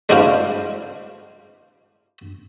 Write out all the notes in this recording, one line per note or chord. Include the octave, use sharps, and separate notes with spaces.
G#3 D4 E4 F#4 C5 F5